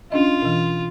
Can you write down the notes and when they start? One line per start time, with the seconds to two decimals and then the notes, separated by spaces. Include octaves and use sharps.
0.12 C#4 D4 F4 D#5
0.42 B2 E3